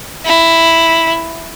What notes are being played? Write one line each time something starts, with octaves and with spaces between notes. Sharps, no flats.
E4